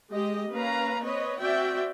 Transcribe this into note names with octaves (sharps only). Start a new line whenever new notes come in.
G#3 G4 D#5
A#3 C#4 B4 F5 A#5
C4 B4 C#5 D#5
C4 F#4 D5 E5 G5